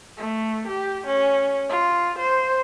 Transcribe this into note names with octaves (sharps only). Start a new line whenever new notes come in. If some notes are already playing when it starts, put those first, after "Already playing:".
A3
G4
C#4
F4
C5